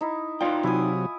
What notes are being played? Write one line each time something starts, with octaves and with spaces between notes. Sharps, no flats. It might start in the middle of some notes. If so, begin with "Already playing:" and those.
D#4 E4
D#4 F4 D5 G5 D6
C3 F#3 E4 G#5 D#6